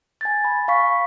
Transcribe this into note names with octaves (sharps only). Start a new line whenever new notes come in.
G#5 G#6 A6
B5
F5 B5 C#6 B6